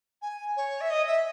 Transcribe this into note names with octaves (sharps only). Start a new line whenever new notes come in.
G#5
C#5
E5
D#5
E5